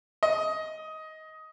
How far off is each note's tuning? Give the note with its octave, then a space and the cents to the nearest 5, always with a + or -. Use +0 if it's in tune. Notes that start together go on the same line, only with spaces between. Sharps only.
D#5 +15